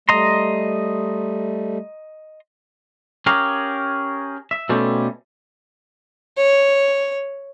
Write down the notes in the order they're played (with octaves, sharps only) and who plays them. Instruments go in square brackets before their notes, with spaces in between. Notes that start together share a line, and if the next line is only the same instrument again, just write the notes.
[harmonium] G3 A3 [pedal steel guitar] D#5 A#5 C6
[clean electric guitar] C#4 G4 G#4 A#4 F5
E5
B2 G3 A3 C4 C#4 A4
[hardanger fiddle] C#5